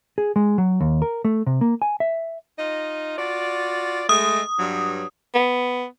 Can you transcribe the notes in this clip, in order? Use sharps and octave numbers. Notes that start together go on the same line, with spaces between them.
G#4
G#3
F#3
D#2
A#4
A3
C3
A#3
G#5
E5
D#4 F4 D#5
F4 F#4 D5
G#3 A3 D#6
G2 F#3
B3